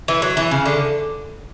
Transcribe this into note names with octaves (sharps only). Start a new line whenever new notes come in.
E3
F#3
E3
C#3
D3